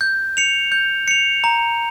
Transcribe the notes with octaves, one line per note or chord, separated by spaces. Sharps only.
G6
C#7 F7
G6
C#7 F7
A#5